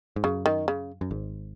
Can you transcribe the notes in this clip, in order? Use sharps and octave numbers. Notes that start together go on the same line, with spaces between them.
G#2
F#2 C#3
D#3
C#3
F#2
G#1 G#2